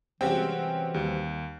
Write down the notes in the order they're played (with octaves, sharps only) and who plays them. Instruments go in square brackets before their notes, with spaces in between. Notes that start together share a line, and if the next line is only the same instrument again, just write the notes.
[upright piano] C3 G3 G#3 [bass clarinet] E3 [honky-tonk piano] C4 C#4 F#4 [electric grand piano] G5
[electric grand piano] D#2 [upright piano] G3